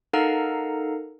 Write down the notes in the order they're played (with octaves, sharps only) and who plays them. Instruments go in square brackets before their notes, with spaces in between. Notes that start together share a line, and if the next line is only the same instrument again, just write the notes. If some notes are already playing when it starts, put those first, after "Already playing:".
[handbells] D#4 A4 A#4 F5 F#5 A#5